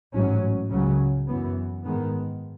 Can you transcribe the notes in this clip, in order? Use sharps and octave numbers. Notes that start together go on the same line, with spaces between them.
A1 G#2 F#3 C#4
C#2 C#3 F#3 C#4
F#2 E3 B3
G#2 D#3 G#3 B3